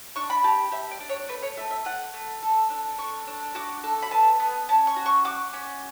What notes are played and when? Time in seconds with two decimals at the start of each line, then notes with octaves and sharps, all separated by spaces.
0.16 D4 C#6
0.30 B5
0.44 G4 A5
0.72 G4 E5
0.91 D5
1.00 D4
1.09 C#5
1.29 A3 B4
1.42 C#5
1.57 A3 E5
1.71 E5
1.85 A3 F#5
2.14 A3
2.42 A4
2.70 D4
2.98 A4 C#6
3.27 D4
3.55 F#4 D6
3.84 A4
4.02 B5
4.11 B3 A5
4.40 B3
4.69 C#4 A5
4.87 C#6
4.96 F#4
5.06 C#6
5.25 F#4 D6
5.54 C#4